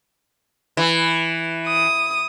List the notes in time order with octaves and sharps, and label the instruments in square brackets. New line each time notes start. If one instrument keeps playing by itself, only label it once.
[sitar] E3
[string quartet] D#6